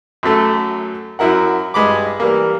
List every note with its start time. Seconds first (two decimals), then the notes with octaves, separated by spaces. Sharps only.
0.23 F#2 F#3 A3 A4
1.19 F#2 F#3 E4 A#4 F#5
1.74 G2 G#3 B5 D6
2.20 E3 G3 A#3